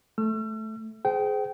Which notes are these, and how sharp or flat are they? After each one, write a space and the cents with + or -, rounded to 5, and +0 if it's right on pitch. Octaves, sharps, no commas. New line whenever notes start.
A3 -10 E6 +45
G#4 +15 C5 -20 G5 -25